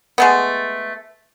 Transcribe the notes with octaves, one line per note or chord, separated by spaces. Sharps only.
G#3 A3 B3